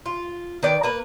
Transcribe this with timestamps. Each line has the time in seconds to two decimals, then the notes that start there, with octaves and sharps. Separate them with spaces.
0.06 F4
0.63 D#3 B4 D5 G5
0.83 A#3 B4